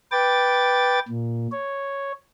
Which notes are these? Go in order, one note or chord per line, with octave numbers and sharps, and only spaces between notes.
B4 G5 D6 A6
A#2
C#5